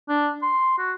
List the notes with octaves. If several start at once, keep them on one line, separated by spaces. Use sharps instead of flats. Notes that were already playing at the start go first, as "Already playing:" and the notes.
D4
C6
F#4